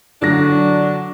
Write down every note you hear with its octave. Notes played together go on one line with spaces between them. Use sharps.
D3 F#3 D4 F#4 A#6